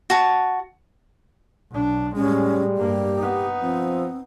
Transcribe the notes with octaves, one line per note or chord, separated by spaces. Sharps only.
F#4 A5
B1 D4
A2 G3 G#3 C#4
G2 A#3 G4
B3 D#4
F3 C4